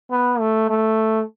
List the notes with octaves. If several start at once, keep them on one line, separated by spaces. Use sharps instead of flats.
B3
A3
A3